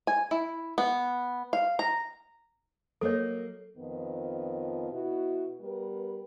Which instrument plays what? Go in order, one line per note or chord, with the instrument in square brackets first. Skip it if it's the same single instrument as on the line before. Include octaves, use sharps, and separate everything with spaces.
[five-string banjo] G#5
E4
B3
F5
A#5
[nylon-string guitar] F#3 A#3 D#5 [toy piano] A4 C#5
[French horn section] F2 D#3 F3 B3
B2 E4 F#4
G3 B3 A#4 B4